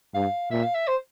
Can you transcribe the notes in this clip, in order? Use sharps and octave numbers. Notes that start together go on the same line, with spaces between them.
G2 F5
A#2 E5
F5
E5
C5